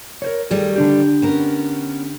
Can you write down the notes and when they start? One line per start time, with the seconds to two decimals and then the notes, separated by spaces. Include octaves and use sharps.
0.22 A#4 C5 C#5
0.51 D#3 G3 A3 G#4
0.76 D3 D4 G4
1.22 B3 C#4 A#4